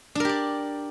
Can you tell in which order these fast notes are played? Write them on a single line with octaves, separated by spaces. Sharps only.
D4 A#4 G4 D5